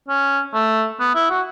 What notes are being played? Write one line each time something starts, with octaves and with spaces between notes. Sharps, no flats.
C#4
A3
B3
E4
F#4